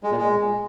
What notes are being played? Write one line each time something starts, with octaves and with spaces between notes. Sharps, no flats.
G#3
A#2
G#3